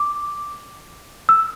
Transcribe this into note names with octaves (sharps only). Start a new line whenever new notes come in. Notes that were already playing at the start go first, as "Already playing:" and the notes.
Already playing: D6
E6